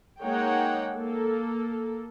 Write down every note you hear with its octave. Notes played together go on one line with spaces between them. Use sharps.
G#3 A#3 D#4 C#5 F#5 G5
A#3 A4